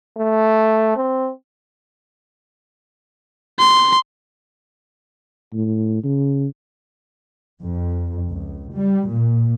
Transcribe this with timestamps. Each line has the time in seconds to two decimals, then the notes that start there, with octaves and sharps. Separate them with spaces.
0.18 A3
0.96 C4
3.59 C6
5.53 A2
6.04 C#3
7.59 F2
8.31 C#2
8.73 G3
9.10 A#2